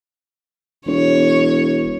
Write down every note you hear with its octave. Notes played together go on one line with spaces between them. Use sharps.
E1 C#5